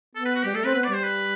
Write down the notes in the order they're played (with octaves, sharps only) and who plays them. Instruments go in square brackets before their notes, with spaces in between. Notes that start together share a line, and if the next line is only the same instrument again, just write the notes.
[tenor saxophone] B3 [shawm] A4
[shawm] B4
F#4
[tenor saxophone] G3 [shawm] G4
[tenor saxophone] A3 [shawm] A4
[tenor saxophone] C4 [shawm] B4
[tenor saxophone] B3 [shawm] B4
[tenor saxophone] G3 [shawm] D5
[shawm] C5
B4